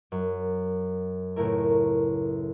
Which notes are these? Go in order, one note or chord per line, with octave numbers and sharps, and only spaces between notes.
F#2
C#2 A2 A3 E4 A#4